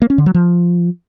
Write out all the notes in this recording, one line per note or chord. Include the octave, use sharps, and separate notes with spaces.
A#3
C#4
D3
F#3
F3